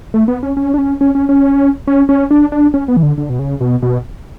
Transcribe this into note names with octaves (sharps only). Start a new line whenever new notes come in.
A3
B3
C#4
C#4
D4
C#4
C#4
C#4
C#4
C#4
C#4
D4
D4
C#4
B3
E3
D3
D3
B2
C#3
B2
B2